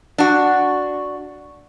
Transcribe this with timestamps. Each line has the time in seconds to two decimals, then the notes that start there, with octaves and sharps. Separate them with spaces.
0.18 D4 F#4